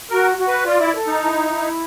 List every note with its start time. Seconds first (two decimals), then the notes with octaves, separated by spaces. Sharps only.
0.10 F#4 A#4
0.38 F#4
0.48 B4
0.66 F4 D5
0.80 E4
0.94 A4
1.07 D#4
1.21 E4
1.50 E4